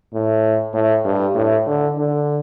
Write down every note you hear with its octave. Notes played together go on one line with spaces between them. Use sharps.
A2
A2
G2
A2
D3
D3